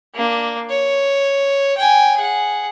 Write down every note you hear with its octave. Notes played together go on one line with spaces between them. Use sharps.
A#3 D4
C#5
G5 G#5
G#4 F#5